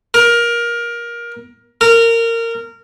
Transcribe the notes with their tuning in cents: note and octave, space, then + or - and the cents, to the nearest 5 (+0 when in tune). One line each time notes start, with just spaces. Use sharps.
A#4 +20
A#4 -20